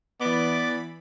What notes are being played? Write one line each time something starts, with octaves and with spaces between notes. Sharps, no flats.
E3 B3 D5 B5 D6